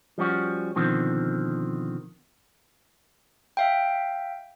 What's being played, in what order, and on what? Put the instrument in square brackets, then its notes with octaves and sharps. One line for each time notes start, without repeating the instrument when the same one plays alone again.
[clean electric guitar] F3 G3 C#4 F#4
B2 D3 D#3 F3 C4
[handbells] E5 F5 G5